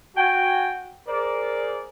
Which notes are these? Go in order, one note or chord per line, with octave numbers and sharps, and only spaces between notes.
F#4 G5 G#5
G#4 A#4 C5 D5